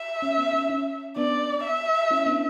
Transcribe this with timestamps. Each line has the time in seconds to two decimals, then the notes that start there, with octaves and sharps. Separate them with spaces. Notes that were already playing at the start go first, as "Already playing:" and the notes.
Already playing: E5
0.22 C#4
0.38 B3
0.53 C#4
0.70 C#4
1.16 B3 D4 D5
1.63 E5
2.11 C#4 E4
2.26 B3 D4